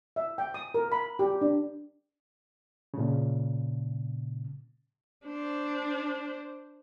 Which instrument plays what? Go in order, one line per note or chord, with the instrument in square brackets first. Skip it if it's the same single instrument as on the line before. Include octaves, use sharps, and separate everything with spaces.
[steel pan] E5
G5
D#6
A#4
B5
G4
D4
[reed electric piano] A#2 C#3
[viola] D4 C5